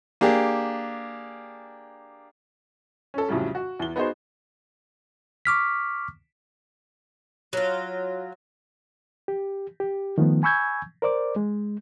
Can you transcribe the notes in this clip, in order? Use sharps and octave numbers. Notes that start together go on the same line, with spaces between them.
A#3 D4 G4 G#4
C#4 A4
F2 A2 C#3 F#3 G3
F#4
E2 G7
B3 D#4 F#4 G#4 C5
C#6 D6 F6 B6
F#3 F4
G4
G4
D#3 F3 A3 B3
G#5 B5 C#6 E6 G6 G#6
A#4 C5 D5 D6
G#3